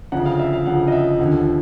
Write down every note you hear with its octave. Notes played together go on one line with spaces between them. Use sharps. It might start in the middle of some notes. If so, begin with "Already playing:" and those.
D2 C#3 F3 F#5
F5
E5
F5
D2 C#3 F3 F#5
D#5
E5
D#2 D3 F3